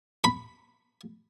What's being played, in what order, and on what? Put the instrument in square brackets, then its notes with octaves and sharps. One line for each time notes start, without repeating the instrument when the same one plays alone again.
[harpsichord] B5